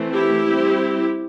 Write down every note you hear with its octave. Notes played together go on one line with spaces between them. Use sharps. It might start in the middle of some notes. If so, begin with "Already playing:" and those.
Already playing: E3 A3 C4
E4 G4
G3 C4